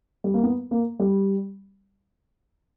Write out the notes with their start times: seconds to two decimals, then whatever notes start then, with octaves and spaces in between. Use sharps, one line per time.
0.24 G3
0.34 A#3
0.43 B3
0.71 A#3
1.00 G3